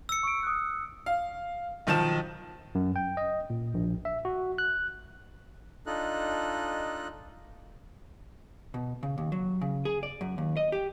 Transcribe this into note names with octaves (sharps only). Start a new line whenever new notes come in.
E6 C#7
C#6 D7
D#6 F#6
F5
B1 D#3 F3 A5 E7
F#2
G5
D#5
A#2
A#1
E5
F#4
F#6
D4 D#4 F4 A4 D#5 F#6
B2
C#3
D#2
F#3
C#3
G#4
D5
F#2
D#2
D#5
G4